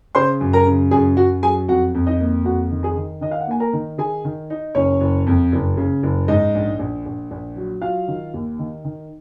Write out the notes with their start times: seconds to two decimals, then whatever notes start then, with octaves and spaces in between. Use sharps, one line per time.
0.15 C#3 C5 C6
0.41 F#2
0.53 A#4 A#5
0.67 C#3
0.91 F#2 G#4 G#5
1.17 F#2 F#4 F#5
1.43 F#3 G#4 G#5
1.68 F2 F#4 F#5
1.95 F2
2.07 D#4 D#5
2.20 A#3
2.45 F2 F#4 F#5
2.71 D#3
2.83 G#4 G#5
2.96 D#3
3.21 D#3 D#5
3.31 F5
3.41 F#5
3.47 A#3 G#5
3.60 A#4 A#5
3.73 D#3
3.98 D#3 G#4 G#5
4.25 D#3
4.50 D#4
4.75 F#1 C#4 C#5
5.01 F#1
5.27 F2
5.52 F#1
5.77 C#3
6.03 F#1
6.28 G#2 D#4 D#5
6.55 A#1
6.79 A#1
7.06 A#1
7.31 A#1
7.56 F#3
7.82 F#3 F4 F5
8.08 D#3
8.34 D#2
8.59 D#3
8.85 D#3